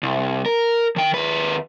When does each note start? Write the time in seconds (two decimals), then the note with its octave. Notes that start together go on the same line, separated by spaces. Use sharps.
0.03 C2
0.46 A#4
0.96 D#3 G5
1.14 D#2 B4